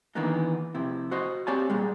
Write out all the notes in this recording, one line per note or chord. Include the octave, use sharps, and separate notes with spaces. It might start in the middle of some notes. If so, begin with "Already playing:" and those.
D#3 E3 A#3 B3 D4 D#4
F2 C3 E4
F#4 C5 D#5
C4 G4 C#5 D5 G#5 A5
A#2 G3 G#3